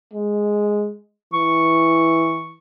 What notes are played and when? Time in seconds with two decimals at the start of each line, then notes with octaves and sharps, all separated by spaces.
0.14 G#3
1.34 E3 C#6